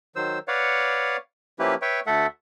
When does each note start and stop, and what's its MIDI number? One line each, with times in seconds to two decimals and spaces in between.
0.16 0.39 51
0.16 0.39 54
0.16 0.39 72
0.16 0.39 88
0.48 1.17 71
0.48 1.17 73
0.48 1.17 74
0.48 1.17 77
0.48 1.17 78
1.59 1.75 53
1.59 1.75 58
1.59 1.75 61
1.59 1.75 64
1.59 1.75 67
1.59 1.75 71
1.82 2.00 71
1.82 2.00 73
1.82 2.00 76
1.82 2.00 79
2.07 2.26 38
2.07 2.26 57
2.07 2.26 69
2.07 2.26 76
2.07 2.26 78